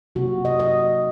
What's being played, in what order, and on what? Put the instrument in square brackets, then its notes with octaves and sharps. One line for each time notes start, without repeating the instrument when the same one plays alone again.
[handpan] C3 F#3 A#3 F#4
D#5
D#5